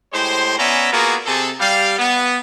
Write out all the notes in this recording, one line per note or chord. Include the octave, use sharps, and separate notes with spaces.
A2 G#3 G4 C5
B3 C#4 D5 E5 G#5 A#5
A#3 B3 F4 F#4 G#4
C3 G#4 A4
G3 F5
B3